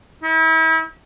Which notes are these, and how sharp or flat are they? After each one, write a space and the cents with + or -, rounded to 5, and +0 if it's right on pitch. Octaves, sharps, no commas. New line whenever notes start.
E4 -40